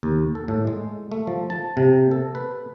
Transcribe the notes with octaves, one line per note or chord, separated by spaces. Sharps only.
D#2
A4
A2
G#3
A3
F3
A5
C3
A4
B4